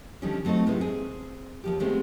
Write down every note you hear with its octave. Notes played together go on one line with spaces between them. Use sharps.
D3 D#3 F3 G3 C4 C#4
F#3 A3 C4 D#4 A4
G#2 C3 G#3 A#3 E4 B4
C4 G#4
D#2 F3 G4
D#3 G#3 A3 B3 C4 G4